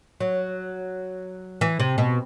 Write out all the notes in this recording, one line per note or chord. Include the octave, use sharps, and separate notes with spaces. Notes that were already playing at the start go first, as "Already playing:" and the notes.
F#3
E3
C3
B2